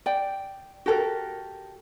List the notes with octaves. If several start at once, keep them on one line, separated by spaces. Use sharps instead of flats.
D5 G5
F#4 G4 A4 A#4